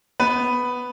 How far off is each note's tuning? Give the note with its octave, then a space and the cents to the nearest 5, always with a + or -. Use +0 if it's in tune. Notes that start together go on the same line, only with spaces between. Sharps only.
B3 +0 B4 +5